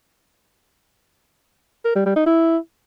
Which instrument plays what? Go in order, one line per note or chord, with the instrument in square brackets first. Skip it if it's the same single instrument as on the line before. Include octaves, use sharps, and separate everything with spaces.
[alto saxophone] A#4
G3
G3
D#4
E4